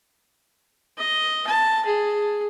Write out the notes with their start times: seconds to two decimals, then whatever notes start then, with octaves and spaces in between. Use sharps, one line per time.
0.98 D#5
1.47 A5
1.85 G#4